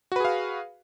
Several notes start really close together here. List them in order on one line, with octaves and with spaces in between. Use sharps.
F#4 B4 G#4 F5